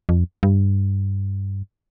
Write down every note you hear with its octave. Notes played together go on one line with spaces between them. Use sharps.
F2
G2